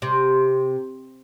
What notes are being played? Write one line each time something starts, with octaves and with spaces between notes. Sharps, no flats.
C3